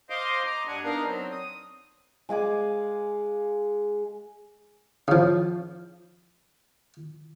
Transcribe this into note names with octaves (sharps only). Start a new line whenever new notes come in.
C5 D#5 F5 C6 D6
D#5 A#5 D6
G2 D4 F#5 G#5
B3 D4 D#4 A#4 F5 A#5
F#3 C4
D#6
G#3 F5 G#5 D6
C#3 F3